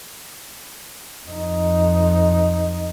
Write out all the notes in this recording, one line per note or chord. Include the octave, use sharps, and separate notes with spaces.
F2 D#4